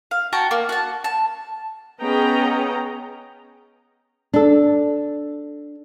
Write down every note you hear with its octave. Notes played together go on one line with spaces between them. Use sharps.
F5
F#4 G5 A5 A#5
A#3
F#4 A5
A5
B3 C#4 G#4 D#5 G5 A#5
D4 A4